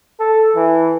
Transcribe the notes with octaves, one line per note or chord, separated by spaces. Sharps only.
A4
E3